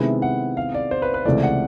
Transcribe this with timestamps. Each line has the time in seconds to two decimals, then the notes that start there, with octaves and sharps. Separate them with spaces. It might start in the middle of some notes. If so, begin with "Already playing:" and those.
Already playing: C3 D#3 G#3 B3 E4
0.22 F#5
0.57 F5
0.74 D5
0.91 C5
1.02 B4
1.14 B4
1.25 C#2 C3 E3 A3 D5
1.43 F#5